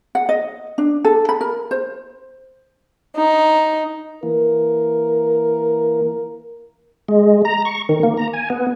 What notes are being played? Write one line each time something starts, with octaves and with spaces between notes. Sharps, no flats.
F#5
D#5
D4
A4
B5
A#4
C5
D#4
E3 A#3 A#4
G#3
A#5
C#6
D#3
A#3
A#5
G#5
B3